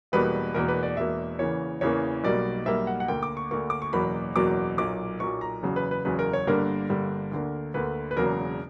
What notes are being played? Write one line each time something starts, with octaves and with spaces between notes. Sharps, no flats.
E1 E2 B2 G3 A#3 B4
E1 E2 B2 A#3 A#4
B4
D5
E1 E2 B2 A#3 E5
E2 C#3 E3 A#3 C#5
E2 C#3 E3 A#3 C#5
B1 B2 G3 A#3 D5
B1 B2 G3 A#3 E5
F#5
F#5
D2 D3 A#3 G5
D6
C#6
D2 D3 A#3 C#6
D6
C#6
F#1 E2 B2 F#3 A#3 B5
F#1 E2 B2 F#3 A#3 D6
B1 A#2 F#3 D6
B1 A#2 F#3 C#6
A#5
F#1 E2 C#3 F#3
B4
B4
F#1 E2 C#3 F#3 B4
A#4
C#5
G1 G2 D3 G3 A#3 A#4
G1 G2 D3 G3 A#3
D2 D3 A#3
D2 D3 A#3 B4
B4
E1 E2 C#3 F#3 A#3 A#4